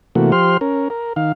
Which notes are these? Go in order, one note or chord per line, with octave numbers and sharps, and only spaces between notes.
C3 E3 A3 A#3 F#4
F3 G4 C5 C6 F6
C#4 A#4
A#4
D#3 F5